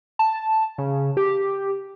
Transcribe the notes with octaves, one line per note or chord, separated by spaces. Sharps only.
A5
C#3
G4